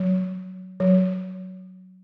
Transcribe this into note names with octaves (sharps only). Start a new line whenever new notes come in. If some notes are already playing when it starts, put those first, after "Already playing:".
Already playing: F#3
F#3